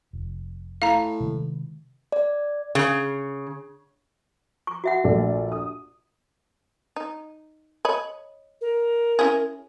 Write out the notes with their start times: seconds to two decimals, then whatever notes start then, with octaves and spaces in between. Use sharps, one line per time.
0.13 F1
0.82 A2 F5 A#5
1.20 C3 D#3 G#3
2.12 D5
2.75 C#3
4.67 C#6
4.84 F#4 E5 F#5
5.04 A#1 A3 D5
5.52 D#6
6.96 D#4
7.85 C#5 D#5 B5
8.61 A#4
9.19 C#4 E4 G#4